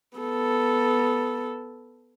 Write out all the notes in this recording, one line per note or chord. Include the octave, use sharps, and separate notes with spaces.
B3 A4